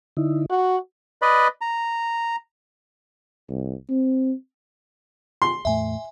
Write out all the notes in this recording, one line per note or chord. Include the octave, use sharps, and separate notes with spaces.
D3 D#4 E4
F#4 F#5
B4 D5 D#5 B5
A#5
C2
C4
C6
E2 A2 A3 E5 G#5